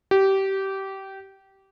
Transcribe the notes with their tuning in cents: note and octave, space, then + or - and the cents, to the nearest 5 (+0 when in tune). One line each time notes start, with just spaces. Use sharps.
G4 -20